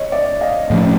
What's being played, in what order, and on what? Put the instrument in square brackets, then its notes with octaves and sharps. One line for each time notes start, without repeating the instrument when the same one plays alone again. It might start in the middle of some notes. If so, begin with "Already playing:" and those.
Already playing: [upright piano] C#5 D#5
D5 E5
D#5 F5
[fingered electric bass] A2 F3 A3 C#4